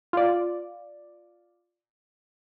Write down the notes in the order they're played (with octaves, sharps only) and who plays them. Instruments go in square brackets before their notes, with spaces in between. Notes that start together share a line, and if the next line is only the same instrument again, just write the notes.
[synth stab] F4 D5